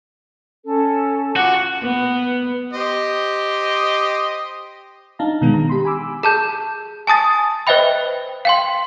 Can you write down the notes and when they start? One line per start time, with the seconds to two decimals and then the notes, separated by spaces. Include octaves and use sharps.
0.65 C#4 A4
1.36 F4 F#4 D6
1.83 B3
2.73 G4 C5 D#5
5.19 D4 D#4 F5 A5 A#5
5.42 B2 D#3 G#3 B3
5.54 A#5
5.69 G4 B5 C6
5.85 G#5 B5 D6 E6
6.23 G#4 A5 G6
7.07 G#5 A5 D#6 A6
7.67 B4 C5 D#5 E5 G5 B5
8.45 F5 G5 C6